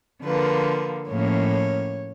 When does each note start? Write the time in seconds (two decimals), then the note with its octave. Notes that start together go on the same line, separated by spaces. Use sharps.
0.24 D3 F3 A#3 B4
1.08 A2 F3 A#3 C#4 C#5